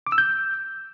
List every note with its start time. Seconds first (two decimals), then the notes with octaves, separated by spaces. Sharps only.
0.07 D6
0.12 E6
0.18 G6